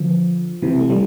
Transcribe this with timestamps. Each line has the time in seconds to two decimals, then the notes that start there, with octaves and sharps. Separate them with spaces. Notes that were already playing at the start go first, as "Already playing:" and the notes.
Already playing: D3 F3
0.62 C3 E3
0.80 A3
0.90 E3 G3